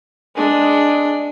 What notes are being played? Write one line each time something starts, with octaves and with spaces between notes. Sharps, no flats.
G#3 D4